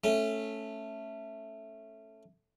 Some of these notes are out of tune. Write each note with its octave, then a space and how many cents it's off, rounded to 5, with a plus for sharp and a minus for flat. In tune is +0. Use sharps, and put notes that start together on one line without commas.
A3 +0 C#4 -10